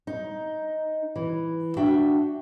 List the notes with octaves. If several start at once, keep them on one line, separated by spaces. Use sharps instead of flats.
D#4
E3
D4 F#4 E5 G5